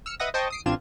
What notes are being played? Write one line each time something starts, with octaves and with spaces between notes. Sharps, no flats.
E6 F6 C#7
B4 D#5 E5 F#5 D#6 A#6
C5 D#5 G5 A5 C#6
D#6 C7 D7
A1 C4 D4 F4 G#6 E7